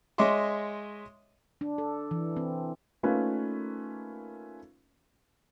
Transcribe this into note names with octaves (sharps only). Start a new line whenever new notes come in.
G#3 C#5 D#5 E5 C6 D6
D4
A4
E3
C4
A3 A#3 C#4 D#4 F4 B4